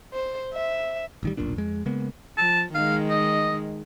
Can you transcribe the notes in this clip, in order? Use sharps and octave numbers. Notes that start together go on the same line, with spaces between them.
C5
E5
A1 D#3 G3
F1 B1 A#2 D4
F2 G#3
C#3 G#3 A#3 B3
F3 A5
D#3 G#3 F5
D#5